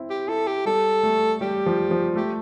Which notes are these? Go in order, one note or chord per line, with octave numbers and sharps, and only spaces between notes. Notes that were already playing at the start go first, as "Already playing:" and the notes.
Already playing: C4 E4
G4
E4 A4
G4
G3 A4
A3
G3 G4
F3
F3
A3 G4